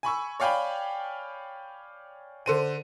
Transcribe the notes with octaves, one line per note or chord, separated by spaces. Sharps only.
G#5 B5 C#6 E6
C#5 D5 F5 G5 G#5 B5
D3 C5 D#7